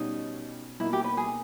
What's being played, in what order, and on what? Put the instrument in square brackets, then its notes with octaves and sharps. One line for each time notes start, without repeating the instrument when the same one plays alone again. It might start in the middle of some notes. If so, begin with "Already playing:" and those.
Already playing: [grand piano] B2 G3 C#4 [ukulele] D#4
[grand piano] B2 A#3 D#4 [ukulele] E4
[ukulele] G4
B4
G#4